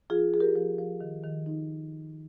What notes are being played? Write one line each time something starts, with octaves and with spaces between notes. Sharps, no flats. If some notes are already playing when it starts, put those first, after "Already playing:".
F3 F4 G#4
F3 G#4
G4 A#4
F3
F3
D#3
D#3
D#4